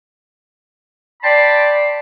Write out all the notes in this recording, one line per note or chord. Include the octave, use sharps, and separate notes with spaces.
D5 G5 A5 B5 C6